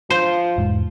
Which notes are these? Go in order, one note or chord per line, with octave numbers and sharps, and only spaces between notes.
F3 C5
E1 G#2